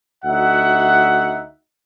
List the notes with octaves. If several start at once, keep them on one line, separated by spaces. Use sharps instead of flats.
D2 D#4 F#4 E5 F#5